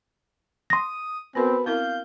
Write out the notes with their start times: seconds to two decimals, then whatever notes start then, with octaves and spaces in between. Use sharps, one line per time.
0.70 C6 D#6 A#6
1.35 B3 C4 F#4 A#4 B4
1.66 C4 E4 A#4 F5 G6